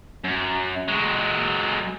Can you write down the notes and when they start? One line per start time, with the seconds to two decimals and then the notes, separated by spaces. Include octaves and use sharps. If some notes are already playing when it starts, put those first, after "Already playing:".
0.24 F#2
0.88 F#3 G#3